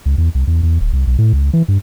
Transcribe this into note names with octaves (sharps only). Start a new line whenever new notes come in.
C#2
E2
C2
E2
E2
D1
C2
B1
A2
C#2
E3
G2